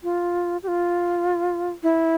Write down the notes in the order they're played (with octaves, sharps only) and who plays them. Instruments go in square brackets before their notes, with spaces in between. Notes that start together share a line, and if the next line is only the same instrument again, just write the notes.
[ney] F4
G4
F4
E4